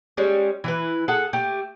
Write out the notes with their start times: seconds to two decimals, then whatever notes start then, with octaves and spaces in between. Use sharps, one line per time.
0.17 G3 G#3 C#4
0.64 E3 E4 B4
1.08 G#4 A4 F#5
1.33 A3 G4